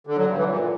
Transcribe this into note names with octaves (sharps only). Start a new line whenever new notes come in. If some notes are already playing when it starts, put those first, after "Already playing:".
D3
F#3
G2
E3
A#2